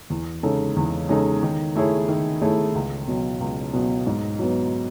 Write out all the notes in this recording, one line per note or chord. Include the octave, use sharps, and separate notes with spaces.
E2
C#3 G#3 D#4 A4
E2
C#3 G#3 D#4 A4
D#3
A3 E4 G#4 C#5
D#3
A3 E4 G#4 C#5
C#2
B2 F#3
C#2
B2 F#3
G#2
F#3 B3